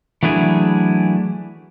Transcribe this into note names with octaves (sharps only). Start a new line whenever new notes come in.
E3 F#3 A3 D4 E4 G#4